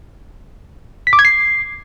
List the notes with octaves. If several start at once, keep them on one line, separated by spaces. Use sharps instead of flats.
B6
D6
G#6
C7